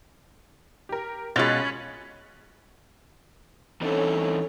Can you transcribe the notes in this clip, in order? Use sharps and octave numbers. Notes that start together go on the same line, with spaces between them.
G4 A#4
B2 G#3 C#4 F4 B5 A6 F7
E3 C4 C#4 D#4 A4 C#5